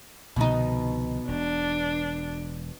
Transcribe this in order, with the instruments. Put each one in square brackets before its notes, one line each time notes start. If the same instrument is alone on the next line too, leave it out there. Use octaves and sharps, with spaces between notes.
[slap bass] C2 D3 F3 [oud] B2 D#4
[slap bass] E1 [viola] D4